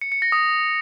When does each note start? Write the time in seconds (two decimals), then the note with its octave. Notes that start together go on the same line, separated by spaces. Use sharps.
0.01 C#7
0.12 C#7
0.22 A#6
0.32 D#6